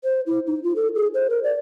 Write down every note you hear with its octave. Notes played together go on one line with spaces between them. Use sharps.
C5
E4
D#4
F4
A4
G#4
C5
A#4
D5